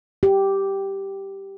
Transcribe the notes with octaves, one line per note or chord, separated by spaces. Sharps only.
G4